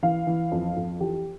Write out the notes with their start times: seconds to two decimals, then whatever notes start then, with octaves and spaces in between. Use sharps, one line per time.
0.03 E3 F5
0.27 E3
0.51 F2
0.76 F2
1.00 E3 G4